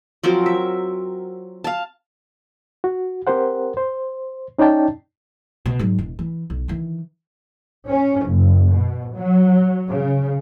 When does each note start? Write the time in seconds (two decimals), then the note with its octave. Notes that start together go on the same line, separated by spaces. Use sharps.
0.23 F3 F#3 C4 A#4
0.46 E5
1.64 F5 A5
2.84 F#4
3.27 C4 G4 A#4 C5 F#5
3.77 C5
4.59 C#4 D#4 C#5 D5 G5 A5
5.66 B2
5.79 G#2 F#3
5.99 E1
6.19 E3
6.50 B1
6.68 D#3 E3
7.88 C#4
8.25 F#1
8.71 B2
9.15 F#3
9.91 C#3